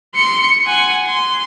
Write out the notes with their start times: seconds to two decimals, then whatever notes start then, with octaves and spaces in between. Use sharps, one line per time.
0.15 C6 C#7
0.66 F#5 G#5
1.06 C6